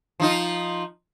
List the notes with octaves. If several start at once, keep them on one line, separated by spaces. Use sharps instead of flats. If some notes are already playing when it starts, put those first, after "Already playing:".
F3 D#4 F4